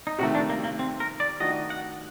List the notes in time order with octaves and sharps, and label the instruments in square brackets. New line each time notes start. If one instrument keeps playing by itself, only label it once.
[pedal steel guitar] D#4
[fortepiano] C3 D#3 A3 [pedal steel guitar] F#4
[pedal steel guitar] D4
A#3
A#3
C4
A#4
D5
[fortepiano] D#3 A3 D4 F#4 [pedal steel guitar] D#5
[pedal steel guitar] F#5